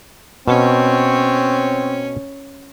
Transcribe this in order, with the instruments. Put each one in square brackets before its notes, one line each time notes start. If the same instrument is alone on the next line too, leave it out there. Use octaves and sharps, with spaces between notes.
[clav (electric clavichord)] B2 [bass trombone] C4 [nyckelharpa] C#4 C#5